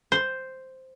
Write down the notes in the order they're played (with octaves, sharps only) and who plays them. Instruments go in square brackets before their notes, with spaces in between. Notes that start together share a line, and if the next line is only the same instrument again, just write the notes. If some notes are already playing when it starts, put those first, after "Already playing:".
[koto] C5